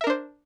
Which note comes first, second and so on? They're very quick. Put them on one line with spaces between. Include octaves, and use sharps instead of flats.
E5 A#4 D4 C5